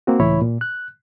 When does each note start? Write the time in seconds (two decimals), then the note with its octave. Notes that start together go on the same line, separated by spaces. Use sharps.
0.07 A#3 C4 F#4
0.20 C#2 A2 E3 E4 C#5 B5
0.42 A#2
0.61 F#6